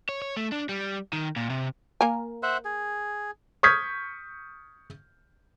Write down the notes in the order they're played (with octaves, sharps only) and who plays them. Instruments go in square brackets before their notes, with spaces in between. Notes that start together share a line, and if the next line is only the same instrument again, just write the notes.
[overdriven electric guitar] C#5
C#5
A3
D4
G3
D#3
A#2
C3
[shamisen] A#3 A#4 G#5
[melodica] C5 E5 F#5
G#4
[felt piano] C#6 D#6 F6 G6 G#6 B6